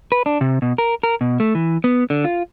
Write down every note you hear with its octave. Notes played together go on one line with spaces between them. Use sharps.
B4
D4
C3
B2
A#4
A#4
B2
A3
E3
B3
D3
F4